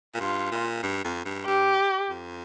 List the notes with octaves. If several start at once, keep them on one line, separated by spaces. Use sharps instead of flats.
A#2
G2 F4
A#2
G2
F2
G2
G2 G4
F2